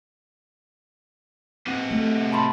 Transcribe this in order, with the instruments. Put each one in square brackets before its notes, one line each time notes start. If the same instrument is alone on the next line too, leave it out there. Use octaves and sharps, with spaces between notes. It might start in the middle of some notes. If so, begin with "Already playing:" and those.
[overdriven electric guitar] C3 F#4
[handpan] A3
[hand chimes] A5 B5 C6